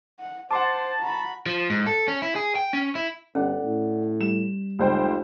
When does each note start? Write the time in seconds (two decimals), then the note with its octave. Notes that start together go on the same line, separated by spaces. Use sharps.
0.20 F#5
0.51 C5 F#5 A5 C6 D6
1.02 F#4 A#5 B5
1.46 F3
1.70 G#2
1.87 A4
2.08 C#4
2.22 E4
2.36 G#4
2.55 G5
2.73 C#4
2.95 E4
3.35 G1 C#4 A4 D5 F#5
3.64 A2
4.21 G3 E7
4.79 F1 C#2 C5 G5